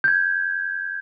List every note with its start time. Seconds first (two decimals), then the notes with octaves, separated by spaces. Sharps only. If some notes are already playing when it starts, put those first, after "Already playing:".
0.04 G6 G#6